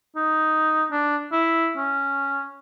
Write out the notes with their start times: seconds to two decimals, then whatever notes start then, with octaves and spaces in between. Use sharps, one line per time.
0.16 D#4
0.91 D4
1.32 E4
1.77 C#4